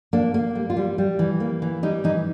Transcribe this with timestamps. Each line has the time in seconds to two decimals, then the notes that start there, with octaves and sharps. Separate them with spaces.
0.13 A#3 D4
0.34 A#3
0.55 G3
0.70 F4
0.77 G3
0.98 G3
1.19 E3
1.40 A#3
1.62 E3
1.83 G3 D#4
2.04 E3 D#4